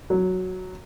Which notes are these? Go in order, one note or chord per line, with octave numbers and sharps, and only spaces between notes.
F#3